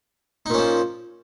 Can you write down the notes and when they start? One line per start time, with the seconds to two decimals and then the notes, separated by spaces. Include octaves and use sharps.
0.46 D#4
0.50 A#2
0.54 C#4
0.58 F3